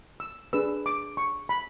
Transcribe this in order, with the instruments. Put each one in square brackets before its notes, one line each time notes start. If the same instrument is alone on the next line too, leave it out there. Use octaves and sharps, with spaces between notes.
[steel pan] E6
D4 G#4 B4 E6
D6
C#6
B5